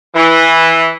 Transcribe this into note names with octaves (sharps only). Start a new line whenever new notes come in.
E3